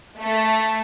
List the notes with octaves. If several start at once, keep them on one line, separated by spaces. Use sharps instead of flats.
A3